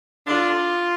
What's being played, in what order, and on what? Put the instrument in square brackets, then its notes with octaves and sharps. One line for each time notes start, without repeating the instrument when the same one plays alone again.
[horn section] D3 D4 [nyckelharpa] F4